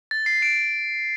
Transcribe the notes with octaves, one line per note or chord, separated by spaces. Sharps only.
A6
C7
D7